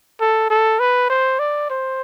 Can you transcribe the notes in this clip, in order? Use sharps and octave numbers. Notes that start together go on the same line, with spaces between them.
A4
A4
B4
C5
D5
C5